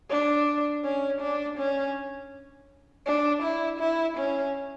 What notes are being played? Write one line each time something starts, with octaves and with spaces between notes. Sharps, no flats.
D4
C#4
D4
C#4
D4
E4
E4
C#4